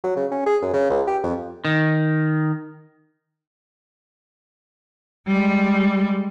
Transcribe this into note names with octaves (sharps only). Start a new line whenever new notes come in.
F#3
C#3
C#4
G#4
F#2
C#3
C#2
G4
F2
D#3
G3 G#3